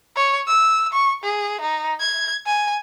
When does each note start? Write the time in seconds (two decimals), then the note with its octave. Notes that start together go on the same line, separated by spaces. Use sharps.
0.16 C#5
0.48 E6
0.93 C#6
1.24 G#4
1.61 D#4
2.00 G#6
2.47 G#5